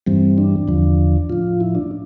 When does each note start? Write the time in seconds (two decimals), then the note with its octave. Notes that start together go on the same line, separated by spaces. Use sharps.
0.06 G2 E3 G3 C4
0.38 D4
0.68 E2 D3 F3
1.30 A2 F3 F4
1.60 E4
1.75 D4